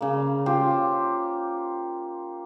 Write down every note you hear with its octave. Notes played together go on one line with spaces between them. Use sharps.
C#3 A#3
F4 G4 C5